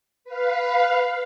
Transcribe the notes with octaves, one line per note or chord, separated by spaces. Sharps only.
B4 F5